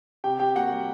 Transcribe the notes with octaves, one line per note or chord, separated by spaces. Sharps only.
C3 G4 G5
C3 G4 G5
A#3 F#4 F#5
G3